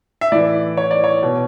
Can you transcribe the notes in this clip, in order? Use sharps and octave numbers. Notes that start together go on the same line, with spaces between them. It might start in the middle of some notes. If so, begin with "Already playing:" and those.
E5
A2 E3 D5
C#5
D5
C#5
B2